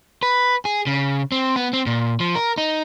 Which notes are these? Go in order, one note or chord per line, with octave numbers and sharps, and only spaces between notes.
B4
G#4
C#3
C4
B3
C4
A#2
F3
A#4
D#4